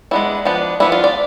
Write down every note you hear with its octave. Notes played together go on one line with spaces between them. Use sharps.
G#3 B3 D4 E4
F3 B3 D4
F3 B3 D4 E4
F4
D5